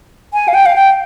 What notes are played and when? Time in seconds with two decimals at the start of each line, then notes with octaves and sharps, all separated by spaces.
0.34 G#5
0.48 F5
0.54 G5
0.66 F5
0.76 G5